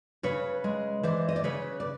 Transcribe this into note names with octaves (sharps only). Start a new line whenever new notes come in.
C#3 B4 C#5
G#3
E3 C5 D5
D#5
D5
C#3 B4 C#5
D5